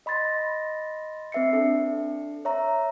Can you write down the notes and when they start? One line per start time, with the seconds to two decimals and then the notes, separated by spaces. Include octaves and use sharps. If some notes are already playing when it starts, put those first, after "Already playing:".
0.06 D#5 B5 C6 A6 A#6
1.32 C4 B4 E5 C7 C#7
1.53 D4 A4
2.45 C#5 E5 A#5